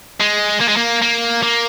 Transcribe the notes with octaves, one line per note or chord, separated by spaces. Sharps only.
G#3
A#3
G#3
A#3
A#3
A#3